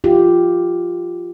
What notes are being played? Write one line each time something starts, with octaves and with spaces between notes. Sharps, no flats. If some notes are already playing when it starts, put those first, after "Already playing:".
F4 G4